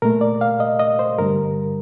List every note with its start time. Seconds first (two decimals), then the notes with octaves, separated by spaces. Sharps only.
0.02 A#2 A3 A#4
0.21 D5
0.41 F5
0.60 D#5
0.80 D#5
0.99 C5
1.18 G2 D3 G3 A#4